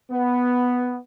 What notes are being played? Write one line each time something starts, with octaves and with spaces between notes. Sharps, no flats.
B3